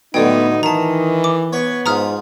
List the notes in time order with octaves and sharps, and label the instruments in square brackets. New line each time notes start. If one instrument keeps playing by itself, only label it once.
[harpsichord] A2 D3 F#3 [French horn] B3 [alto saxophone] D#4 [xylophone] D5 G5
[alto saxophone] D#3 [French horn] E3 [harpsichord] D#5 [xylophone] A5 A#5
[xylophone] D6
[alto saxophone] B3 [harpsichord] C#5 C#6
[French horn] G#2 [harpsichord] F3 F5 [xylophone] A#5 D#6 F6